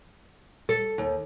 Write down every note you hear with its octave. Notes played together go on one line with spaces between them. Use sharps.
A4
D#2